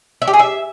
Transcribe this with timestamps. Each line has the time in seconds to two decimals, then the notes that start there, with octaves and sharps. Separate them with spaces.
0.22 E5
0.28 G4
0.33 G#4
0.39 E5